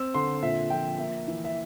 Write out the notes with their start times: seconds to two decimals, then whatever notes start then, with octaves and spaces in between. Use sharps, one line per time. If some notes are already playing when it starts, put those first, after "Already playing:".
Already playing: C4 E6
0.14 D3 C6
0.42 A#2 E5
0.70 F3 G5
0.99 A#3 E5
1.28 E3
1.45 E5